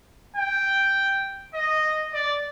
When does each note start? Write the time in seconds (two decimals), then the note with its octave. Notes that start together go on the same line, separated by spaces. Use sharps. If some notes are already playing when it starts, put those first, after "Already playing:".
0.36 G5
1.54 D#5
2.14 D5